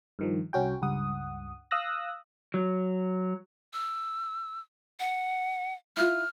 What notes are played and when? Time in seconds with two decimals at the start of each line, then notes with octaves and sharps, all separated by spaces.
0.19 G2 D#3 F3
0.53 C2 C#4 F#4 G5
0.82 C#2 G2 F#5 D#6
1.71 F5 D#6 E6 F#6 A#6
2.54 F#3
3.74 E6
5.00 F#5
5.97 E4 F4 F6